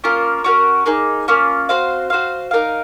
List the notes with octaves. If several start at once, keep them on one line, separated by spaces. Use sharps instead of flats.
A#3 C#4 F4 A#4
C#4 F#4 A#4
A#3 D#4 G#4
A#3 C#4 F4
C4 F#4 C5 F5
F#4 C5 F5
D#4 A#4 F5